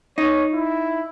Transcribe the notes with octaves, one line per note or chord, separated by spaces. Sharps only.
D#4 C#5
E4